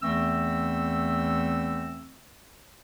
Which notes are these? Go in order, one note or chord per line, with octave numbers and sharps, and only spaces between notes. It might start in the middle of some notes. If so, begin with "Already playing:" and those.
E2 E3 A3 C4 E6